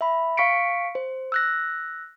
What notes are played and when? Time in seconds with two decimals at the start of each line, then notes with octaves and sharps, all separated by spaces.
0.01 E5 B5
0.37 F5 C#6 B6 C#7 D7
0.95 C5
1.32 E6 F#6 A#6